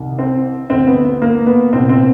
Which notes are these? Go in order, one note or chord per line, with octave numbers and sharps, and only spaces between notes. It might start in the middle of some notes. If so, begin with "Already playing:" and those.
Already playing: C2 C3 D#3
C4
D2 D3 C4
B3
B3
A#3
B3
C2 A#2 C4
C4